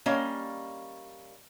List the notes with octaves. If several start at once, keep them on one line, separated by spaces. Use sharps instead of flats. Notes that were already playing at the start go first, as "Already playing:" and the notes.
G3 A#3 C#4 D#5 F5